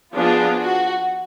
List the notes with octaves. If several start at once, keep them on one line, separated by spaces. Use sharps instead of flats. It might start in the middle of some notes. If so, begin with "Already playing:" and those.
F3 B3 D4 F4 G#4
F#4